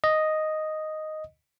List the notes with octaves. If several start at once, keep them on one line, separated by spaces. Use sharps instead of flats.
D#5